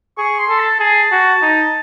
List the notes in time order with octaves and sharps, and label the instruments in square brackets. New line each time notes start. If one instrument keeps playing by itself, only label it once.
[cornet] G#4 [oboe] C#6
[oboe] C6
[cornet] A4
[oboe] A5
[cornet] G#4 [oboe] A5
[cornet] F#4
D#4